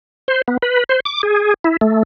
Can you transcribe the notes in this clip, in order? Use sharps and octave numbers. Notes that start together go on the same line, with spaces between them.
C5
B3
B4
C5
D6
G#4
E4
A3